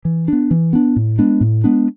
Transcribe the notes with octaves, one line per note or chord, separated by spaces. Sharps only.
E3
B3 D4
E3
B3 D4
A2
G#3 B3 D4
A2
G#3 B3 D4